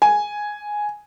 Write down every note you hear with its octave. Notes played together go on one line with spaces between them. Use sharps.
G#5